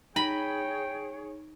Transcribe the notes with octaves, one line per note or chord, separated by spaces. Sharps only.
D#4 G#4 C#5 G5 B5